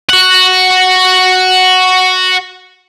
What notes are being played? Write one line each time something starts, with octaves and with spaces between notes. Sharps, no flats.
F#4 F#5